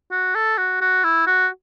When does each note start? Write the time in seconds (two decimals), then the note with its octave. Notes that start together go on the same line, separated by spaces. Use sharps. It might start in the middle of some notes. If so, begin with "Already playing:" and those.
0.12 F#4
0.35 A4
0.58 F#4
0.81 F#4
1.04 E4
1.27 F#4